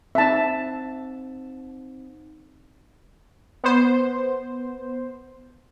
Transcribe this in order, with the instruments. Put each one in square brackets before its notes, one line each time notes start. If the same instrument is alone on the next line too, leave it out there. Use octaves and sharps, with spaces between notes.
[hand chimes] C4 D#4 [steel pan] E5 A5
[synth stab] B3 C5